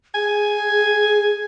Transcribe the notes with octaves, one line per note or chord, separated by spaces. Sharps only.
G#4 G#5